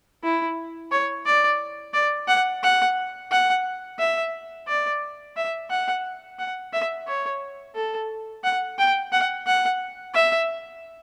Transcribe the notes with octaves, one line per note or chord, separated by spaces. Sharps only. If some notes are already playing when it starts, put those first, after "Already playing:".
E4
C#5
D5
D5
F#5
F#5
F#5
E5
D5
E5
F#5
F#5
E5
C#5
A4
F#5
G5
F#5
F#5
E5